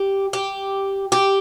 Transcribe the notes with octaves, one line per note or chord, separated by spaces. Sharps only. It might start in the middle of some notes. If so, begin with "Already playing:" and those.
Already playing: G4
G4
G4